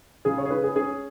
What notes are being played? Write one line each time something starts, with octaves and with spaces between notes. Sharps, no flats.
C#3 G#4
C#5
G#4
C#4 B4
G#4
C#4 G#4